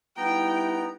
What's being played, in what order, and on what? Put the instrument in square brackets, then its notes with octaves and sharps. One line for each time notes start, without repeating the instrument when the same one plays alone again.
[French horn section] G3 D#4 E4 [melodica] B3 A#5 [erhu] G5